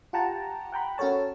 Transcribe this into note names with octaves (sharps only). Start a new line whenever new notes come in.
F4 G4 F#5 G5 A5 A#5
F#5 G5 A#5 B5
C#4 F#4 A4 A#4 C#5 A5